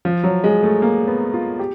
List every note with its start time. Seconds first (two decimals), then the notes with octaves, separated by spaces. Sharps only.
0.05 F3
0.24 F#3
0.44 G#3
0.63 A3
0.82 A#3
1.07 B3
1.34 F4
1.59 G4